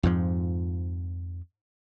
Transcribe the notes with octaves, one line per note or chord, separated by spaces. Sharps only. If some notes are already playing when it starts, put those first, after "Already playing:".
F2 G#2 F3